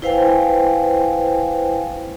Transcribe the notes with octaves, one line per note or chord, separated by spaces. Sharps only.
E4 B4 C5 F5 G5 G#5